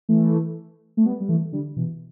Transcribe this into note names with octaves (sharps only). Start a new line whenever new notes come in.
E3 A3
A3
G3 B3
G3
E3 A3
D3 G3
B2 E3